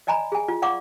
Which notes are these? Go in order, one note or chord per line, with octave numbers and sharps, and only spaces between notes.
D5 D#5 G#5 A#5 B5
G#4 G#5
F4
D5 F5 F#5 C#6 D6